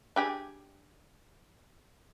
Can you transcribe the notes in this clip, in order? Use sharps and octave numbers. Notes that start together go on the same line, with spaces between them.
D4 G4 G#4